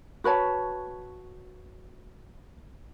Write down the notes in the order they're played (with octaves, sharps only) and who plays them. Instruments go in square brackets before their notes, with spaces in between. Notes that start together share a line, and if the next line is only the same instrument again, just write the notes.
[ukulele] F#4 B4 C#5 A5